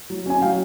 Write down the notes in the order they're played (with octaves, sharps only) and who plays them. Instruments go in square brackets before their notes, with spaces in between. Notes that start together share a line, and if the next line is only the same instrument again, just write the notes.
[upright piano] F#3
C#4 G#5
F#3 F5 G5